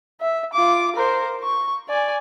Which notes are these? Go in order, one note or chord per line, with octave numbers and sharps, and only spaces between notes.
E5
F4 D6
A#4 C5
C#6
D5 G#5